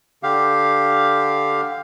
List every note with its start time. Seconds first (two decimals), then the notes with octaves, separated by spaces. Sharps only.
0.23 D3 G4 F5